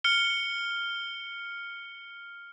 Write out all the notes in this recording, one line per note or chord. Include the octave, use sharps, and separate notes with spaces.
F6 C#7 G7